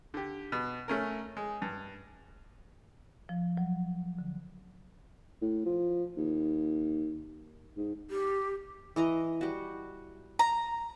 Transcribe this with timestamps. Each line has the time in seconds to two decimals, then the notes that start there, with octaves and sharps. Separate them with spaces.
0.14 D3 G4
0.52 B2
0.88 A3 C#4 A#4
1.37 G#3
1.62 G2
3.29 F3
3.57 F#3
4.19 D3
5.42 A2
5.65 F3
6.17 D#2
7.77 G#2
8.10 G4
8.96 E3 D#5 A#5
9.41 G3 F#4
10.39 A#5